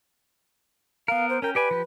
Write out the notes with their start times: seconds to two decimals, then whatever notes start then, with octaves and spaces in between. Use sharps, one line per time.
1.08 B3 A#4 F5
1.29 C5
1.42 C#4 A#4 G5
1.55 G4 B4 D5 G#5
1.71 F3 G4